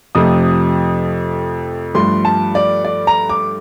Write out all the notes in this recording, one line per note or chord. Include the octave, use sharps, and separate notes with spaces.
F2 C3 F3 A3 D#6
G2 F3 A3 C6
A5
D5
D5
A#5
D6